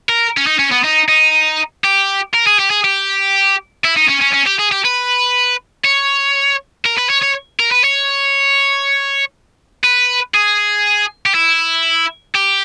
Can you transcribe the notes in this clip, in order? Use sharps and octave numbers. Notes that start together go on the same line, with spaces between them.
A#4
C#4
D#4
C#4
B3
D#4
D#4
G4
A#4
G#4
G4
G#4
G4
E4
D#4
C#4
C#4
C#4
G4
G#4
G4
B4
C#5
A#4
B4
C#5
C#5
A#4
B4
C#5
B4
G#4
G4
E4
G4